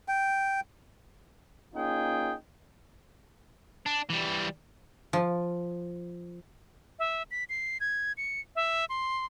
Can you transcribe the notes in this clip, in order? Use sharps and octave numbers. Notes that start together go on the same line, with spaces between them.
G5
A#3 C#4 D#4 F4 G#4 G5
D4
E3 G3
F3
E5
B6
C7
G#6
C#7
E5
C6